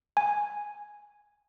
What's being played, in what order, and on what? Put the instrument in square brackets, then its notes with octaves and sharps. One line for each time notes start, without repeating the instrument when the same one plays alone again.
[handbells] G#5